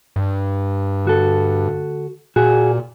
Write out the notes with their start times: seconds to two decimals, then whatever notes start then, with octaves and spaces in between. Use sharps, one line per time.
0.16 G2
1.05 D2 F#4 A4
2.36 A#2 F#4 G#4